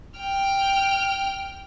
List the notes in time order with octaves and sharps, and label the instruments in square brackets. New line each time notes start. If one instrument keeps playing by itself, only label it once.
[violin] G5 F6